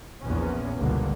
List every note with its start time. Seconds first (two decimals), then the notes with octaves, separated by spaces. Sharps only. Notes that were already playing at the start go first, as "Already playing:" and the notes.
0.23 A#1 E2 C#4
0.78 G1 C#2 B2 D3 A#3